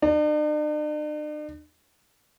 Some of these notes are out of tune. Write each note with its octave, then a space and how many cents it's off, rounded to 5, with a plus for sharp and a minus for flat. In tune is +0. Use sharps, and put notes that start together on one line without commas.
D4 +45